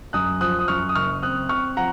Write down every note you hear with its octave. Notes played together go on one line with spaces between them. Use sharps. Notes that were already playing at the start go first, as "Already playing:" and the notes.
F#2 D#6 F#6
F3 D#6 F#6
D#6
F#2 C#6 F6
D#6
F#1 C#6 F6
C4 D#6 F#6
C4 C#6 F6
F3 F#5 A#5